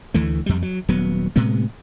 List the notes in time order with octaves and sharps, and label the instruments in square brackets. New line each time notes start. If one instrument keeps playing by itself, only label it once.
[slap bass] D2 E3 A3
F2 G3
F#3
D#1 F#3 B3
A2 C3 G#3 B3